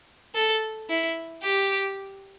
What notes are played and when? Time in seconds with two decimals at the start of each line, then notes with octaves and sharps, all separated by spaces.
0.35 A4
0.90 E4
1.43 G4